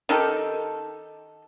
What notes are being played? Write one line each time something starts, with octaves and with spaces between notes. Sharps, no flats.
D#3 D#4 G4 A4